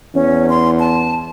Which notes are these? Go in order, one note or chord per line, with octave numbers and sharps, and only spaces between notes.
E2 C#4
C6
A5